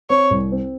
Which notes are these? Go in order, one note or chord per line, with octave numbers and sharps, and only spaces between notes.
C4 C#5
C2
C4